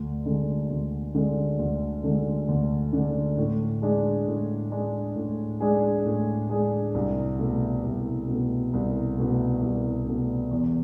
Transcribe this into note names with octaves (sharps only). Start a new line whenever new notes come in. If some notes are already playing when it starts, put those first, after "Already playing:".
Already playing: D2
D3 G#3
D2
D3 G#3
D2
D3 G#3
D2
D3 G#3
A2
G#3 D4 G#4
A2
G#3 D4 G#4
A2
G#3 D4 G#4
A2
G#3 D4 G#4
C2
B2 A3
C2
B2 A3
C2
B2 A3
C2
B2 A3
E2